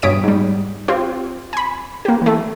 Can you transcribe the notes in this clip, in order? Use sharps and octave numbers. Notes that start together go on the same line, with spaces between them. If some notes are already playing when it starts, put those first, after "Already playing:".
G2 B2 C#5 D#6 B6 D7
G#2 G3
C4 F4 G4
G#5 B5
A#3 G4
E3 A3